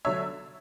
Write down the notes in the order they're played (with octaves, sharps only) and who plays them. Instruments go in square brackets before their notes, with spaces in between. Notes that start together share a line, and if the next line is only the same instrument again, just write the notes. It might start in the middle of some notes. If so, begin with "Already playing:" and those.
[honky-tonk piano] D3 F#3 C#5 E5